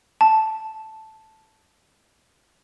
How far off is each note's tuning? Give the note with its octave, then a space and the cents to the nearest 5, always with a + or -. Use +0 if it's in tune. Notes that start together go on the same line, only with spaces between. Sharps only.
A5 -5